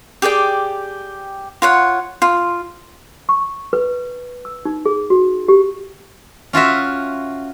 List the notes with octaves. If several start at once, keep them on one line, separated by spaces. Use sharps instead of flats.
G4 G#4 D5 G5
F4 C#5 F#5
F4
C#6
B4
E6
D#4
G#4
F#4
G4
C#4 F4 F#4 E5